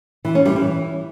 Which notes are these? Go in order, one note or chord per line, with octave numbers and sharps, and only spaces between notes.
E3
C#4
G3
E3